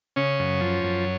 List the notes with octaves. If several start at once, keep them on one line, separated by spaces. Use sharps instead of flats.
C#3 C#4
F#2
F3
F#2